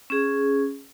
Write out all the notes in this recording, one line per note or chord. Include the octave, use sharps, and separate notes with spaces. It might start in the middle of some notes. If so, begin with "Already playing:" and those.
C#4 G#4